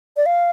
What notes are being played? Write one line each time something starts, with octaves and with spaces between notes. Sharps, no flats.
D5
F5